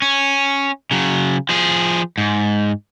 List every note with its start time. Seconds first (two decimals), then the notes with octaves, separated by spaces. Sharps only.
0.02 C#4
0.91 C#3 F#3
1.49 F3 G#4
2.18 G#2